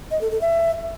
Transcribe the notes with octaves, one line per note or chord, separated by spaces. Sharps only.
D#5
A4
A4
E5